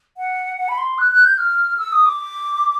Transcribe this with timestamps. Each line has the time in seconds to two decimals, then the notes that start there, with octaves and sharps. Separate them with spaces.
0.17 F#5
0.57 F#5
0.68 B5
0.78 C6
0.98 F#6
1.12 F#6
1.25 G6
1.38 F6
1.78 E6
1.92 D#6
2.06 D6